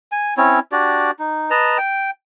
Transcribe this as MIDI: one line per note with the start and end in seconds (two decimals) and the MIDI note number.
0.12 0.34 80
0.37 0.59 60
0.37 0.59 61
0.37 0.59 64
0.37 0.59 73
0.72 1.11 62
0.72 1.11 66
0.72 1.11 67
0.72 1.11 74
1.19 1.50 63
1.50 1.78 71
1.50 1.78 75
1.50 1.78 81
1.50 1.78 82
1.78 2.10 79